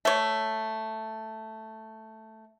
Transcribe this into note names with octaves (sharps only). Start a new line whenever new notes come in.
A3 C#5